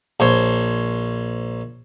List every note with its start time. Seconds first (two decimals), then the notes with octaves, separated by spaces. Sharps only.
0.20 A#1 C5 C#5